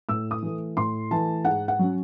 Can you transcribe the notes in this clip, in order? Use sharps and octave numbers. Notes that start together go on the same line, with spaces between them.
A2 E6
D#6
E3 A3
A2 C6
E3 A3 A5
G#2 F#5
F#5
F#3 C#4